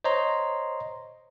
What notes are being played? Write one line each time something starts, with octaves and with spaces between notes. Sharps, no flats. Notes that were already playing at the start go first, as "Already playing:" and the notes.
C5 C#5 D#5 A#5 C6